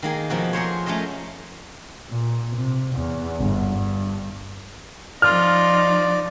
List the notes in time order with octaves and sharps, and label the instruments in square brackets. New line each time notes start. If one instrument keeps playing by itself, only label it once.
[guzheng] D#3 A#3 G#4
B2 F3 A#3 F#4
G#4 A#4 C5 C#5
A3 C#4 A#4 C5 D#5
[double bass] A#2
C3
E2
G1
G2
[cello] F3 D#4 [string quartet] F4 [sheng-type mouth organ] D5 [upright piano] F6